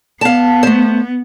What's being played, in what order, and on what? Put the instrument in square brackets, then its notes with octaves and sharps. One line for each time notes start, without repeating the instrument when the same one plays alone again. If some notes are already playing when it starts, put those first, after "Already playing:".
[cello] B3 [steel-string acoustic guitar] F5 A5
[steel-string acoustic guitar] A3 C5